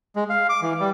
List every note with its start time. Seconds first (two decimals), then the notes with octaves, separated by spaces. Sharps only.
0.16 G#3
0.30 F5
0.49 D6
0.62 E3
0.80 G3